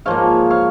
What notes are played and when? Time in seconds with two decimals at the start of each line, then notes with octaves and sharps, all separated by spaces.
0.06 G#2 F3 A#3 C#5 F5
0.50 C#5 F5